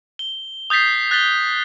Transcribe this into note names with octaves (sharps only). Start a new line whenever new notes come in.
G7
D#6 G6 A6 B6 C7
F#6 A6 B6 G7